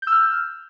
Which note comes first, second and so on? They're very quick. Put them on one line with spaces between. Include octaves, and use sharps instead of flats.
G6 E6 F6